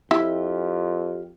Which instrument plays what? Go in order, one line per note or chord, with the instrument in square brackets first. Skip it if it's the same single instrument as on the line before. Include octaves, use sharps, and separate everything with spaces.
[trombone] F2 [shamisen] E4 E5 [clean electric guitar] F4 G4